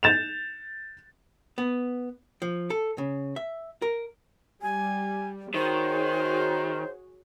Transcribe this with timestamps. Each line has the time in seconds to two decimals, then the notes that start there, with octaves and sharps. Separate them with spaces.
0.03 G6 A6 E7 F7
1.58 B3
2.42 F3
2.70 A4
2.98 C#3
3.36 E5
3.82 A#4
4.62 G3 G#5
5.54 D#3 F#4 G#4 C5 C#5